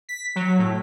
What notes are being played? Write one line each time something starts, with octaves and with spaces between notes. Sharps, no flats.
B6
F#3
A2